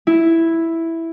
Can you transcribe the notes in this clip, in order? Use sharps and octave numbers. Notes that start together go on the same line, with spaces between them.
E4